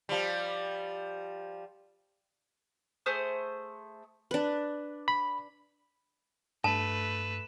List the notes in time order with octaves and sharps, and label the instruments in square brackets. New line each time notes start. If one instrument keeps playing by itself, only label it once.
[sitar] F3 G3
[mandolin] A3 G#4 C5 D#6
[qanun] D4 B4
[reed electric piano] B5
[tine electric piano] G2 [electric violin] A3 B4 [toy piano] A5 [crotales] E7